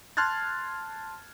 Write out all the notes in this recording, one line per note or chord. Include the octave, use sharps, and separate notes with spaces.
A5 C6 F6 F#6 G#6 A6